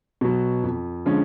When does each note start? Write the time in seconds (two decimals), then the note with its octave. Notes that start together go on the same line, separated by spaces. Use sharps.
0.21 B2 F#3
0.64 F2
1.06 D3 F3 G#3 C#4